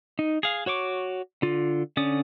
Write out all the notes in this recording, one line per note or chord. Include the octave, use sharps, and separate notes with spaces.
D#4
G#4 F5
F#4 C#5 C#6 D6
D3 F4
D3 C#4 D5 D#6